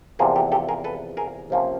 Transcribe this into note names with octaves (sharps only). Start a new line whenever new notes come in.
E2 C3 F3 A#3 G#4 A#4
G4 A4
G4 A4
G#4 A#4
A4 B4
G#4 A#4
C3 F3 A#3 C#4